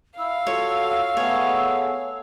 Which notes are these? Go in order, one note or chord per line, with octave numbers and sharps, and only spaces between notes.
E4 F5 E6
F4 F#4 A4 C#5
A3 B3 G#4 C#5